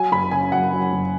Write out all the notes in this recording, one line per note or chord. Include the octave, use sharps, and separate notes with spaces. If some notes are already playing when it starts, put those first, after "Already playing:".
Already playing: F#3 G#5
F#1 B5
C#3 G#5
F#2 F#5
F#3
F#1